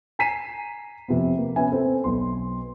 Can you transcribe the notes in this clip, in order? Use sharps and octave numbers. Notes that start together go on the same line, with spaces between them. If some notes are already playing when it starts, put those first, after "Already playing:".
G#5 A#5 B6 C7 D#7 E7
F2 C3 B3
A#3
B3 C#4 E5 G#5
C4 A4
B1 B3 C6